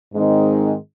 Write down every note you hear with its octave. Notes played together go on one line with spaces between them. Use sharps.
G#2 D#3 G#3 C4 D#4